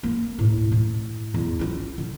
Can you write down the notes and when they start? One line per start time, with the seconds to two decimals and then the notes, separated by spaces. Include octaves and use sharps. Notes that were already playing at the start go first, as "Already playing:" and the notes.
0.03 A#3
0.39 D2 A2
0.72 A2
1.34 E2
1.59 C#4 F4
1.98 D3